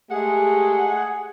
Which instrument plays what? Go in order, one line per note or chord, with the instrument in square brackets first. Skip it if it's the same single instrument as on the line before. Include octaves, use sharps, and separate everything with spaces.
[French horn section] G#3 A3 G4 [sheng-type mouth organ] G#4 [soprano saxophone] F#5